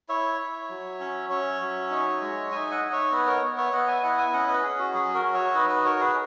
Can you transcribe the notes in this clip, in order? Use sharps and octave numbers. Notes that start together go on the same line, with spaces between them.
E4 C#5 E5
E4
F#3
C#4
C#4 C#5 E5
F#3
D#4
G#3
D#4 E5 G#5
D#5 F#5
D#4
C#5 E5
B3 B4 D#5
A#4 C#5
B3
C#5 E5
B3 D#5 F#5
E5 G#5
E4 D#5 F#5
E5 G#5
C#4 D#5 F#5
B4 D#5
C#4 G#4
F#4
F#3 G#4
F#4 A#4
F#4
C#5 E5
D#4 B4 D#5
B4 D#5
F#4 A#4 C#5
G#4 B4